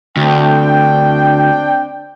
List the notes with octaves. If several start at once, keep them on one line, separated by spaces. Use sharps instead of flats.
D2 C4 D4 G5